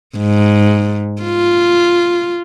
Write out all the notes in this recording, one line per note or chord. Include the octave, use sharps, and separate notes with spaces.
G#2
F4